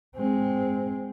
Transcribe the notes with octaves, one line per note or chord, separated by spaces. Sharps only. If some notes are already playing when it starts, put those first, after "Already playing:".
G#3 C4